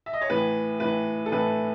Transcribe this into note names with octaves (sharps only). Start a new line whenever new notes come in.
E5
D#5
C#5
A2 E3 B4
A2 E3 B4
A4
A2 E3 B4